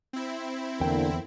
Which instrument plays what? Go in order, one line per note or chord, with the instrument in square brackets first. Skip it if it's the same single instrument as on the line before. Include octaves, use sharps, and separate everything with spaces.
[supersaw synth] C4 E4
[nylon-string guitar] E2 G5 [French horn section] D3 A#3